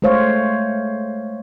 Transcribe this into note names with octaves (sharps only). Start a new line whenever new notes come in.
G#3 A3 C5 C#5 F5